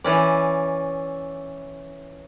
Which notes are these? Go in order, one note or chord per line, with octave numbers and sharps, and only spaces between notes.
E3 C#4 D5